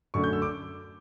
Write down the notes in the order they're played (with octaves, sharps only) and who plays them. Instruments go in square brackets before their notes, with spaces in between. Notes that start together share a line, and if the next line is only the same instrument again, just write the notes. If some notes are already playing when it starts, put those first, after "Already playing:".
[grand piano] F#2 D3 F#3 A3 D4 C#6
G6
E6
D6